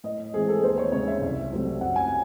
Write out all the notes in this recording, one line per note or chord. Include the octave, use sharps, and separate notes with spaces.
A2 D#5
E3 G#3 C4 G#4
A4
D#2 C5
C#5
C#3 G#3 C4 C#5
E5
C2
C3 F#3 A3 C4
F#2 F#5
G#5